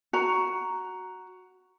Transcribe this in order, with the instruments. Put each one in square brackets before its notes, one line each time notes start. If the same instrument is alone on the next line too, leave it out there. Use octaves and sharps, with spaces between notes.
[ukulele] F#4 A#5